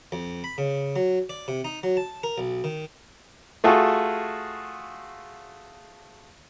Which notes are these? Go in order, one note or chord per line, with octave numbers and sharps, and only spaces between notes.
F2
B5
C#3
F#3
D5
C3
D#4
F#3
A5
A#4
B1
D#3
A3 F4 F#4 G#4 A4